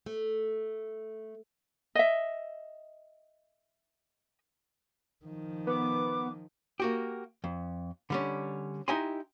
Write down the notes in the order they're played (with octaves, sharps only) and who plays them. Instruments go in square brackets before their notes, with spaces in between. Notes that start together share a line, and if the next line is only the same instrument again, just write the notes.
[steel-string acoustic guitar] A3
[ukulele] D#5 E5
[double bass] D#3 F3
[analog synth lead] B3 [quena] D6
[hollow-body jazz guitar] A#3 F#4 G4
F2
D3 G3 C#4
D#4 E4 G4 D#5 G#5 C6